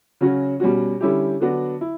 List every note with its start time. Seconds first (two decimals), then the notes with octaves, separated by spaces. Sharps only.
0.21 C#3 F#3 C#4 F#4
0.60 B2 G3 C#4 F#4
1.00 D3 G3 C#4 E4 G4
1.40 D3 F#3 B3 D4 F#4
1.81 E4